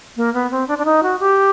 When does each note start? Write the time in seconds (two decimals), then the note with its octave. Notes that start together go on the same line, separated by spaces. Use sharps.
0.17 A#3
0.34 B3
0.51 C4
0.68 D4
0.78 D4
0.85 D#4
1.03 F#4
1.20 G4